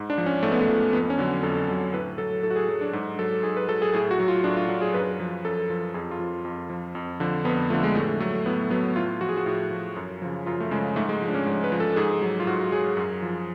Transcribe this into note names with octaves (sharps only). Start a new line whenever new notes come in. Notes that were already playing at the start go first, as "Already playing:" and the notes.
Already playing: G#2
D4
F3
C#4
G#2 A3
B3
A3
F3
F2 B3
C#4
D3 F#3
F2 A4
D3 F#3
A2 B4
F#3 A4
A2 A4
F#4
G#4
F#3
D4
G#2
F#3 A4
G#2 G#4
B4
F#3 A4
G#4
A2 G#4
F#4
F#3
F4
A2 D4
F4
F#3
G#4
F#2 B4
F3
F#2 A4
F3
F2 G#4
F4
F3
F2
F3
F2
D3 F3
F2 B3
D3 F3 A3
G#3
A2 A3
F#3 A3
A2 B3
F#3 B3
A2 F4
F3 F#4
G#4
F#4
A2
F3
F#2
C#3 F3
F#2 F4
A3
C#3 F3 G#3
G#2 A3
G#3
F3
D4
C#4
G#2
B4
F3
A4
G#2 G#4
F#3
F4
G#2 F#4
F#3 G#4
F#2
F3